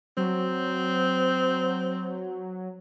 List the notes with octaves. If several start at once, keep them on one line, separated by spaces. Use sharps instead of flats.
F#3 C4